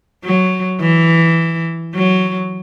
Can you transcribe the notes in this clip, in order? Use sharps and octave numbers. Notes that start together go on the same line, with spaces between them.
F#3
E3
F#3